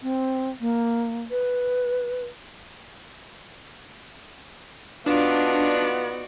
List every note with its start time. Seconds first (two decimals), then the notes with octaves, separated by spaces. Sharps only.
0.02 C4
0.61 A#3
1.30 B4
5.06 B3 D4 D#4 F4 F#4 D5